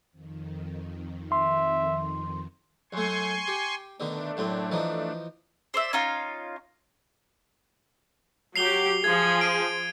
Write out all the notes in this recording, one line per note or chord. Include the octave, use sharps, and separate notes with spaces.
F2 D#3
E5 C6
F#2 A3 G#5 C6 C#6
G4
B2 D3 D#3 A3 D4
F#2 A2 C4
E3 F3 D#4
C5 D5 E5
C#4 D#4 F4 F5
F#3 G4 C7 F7 G7
F3 G#4 G#6
D7 D#7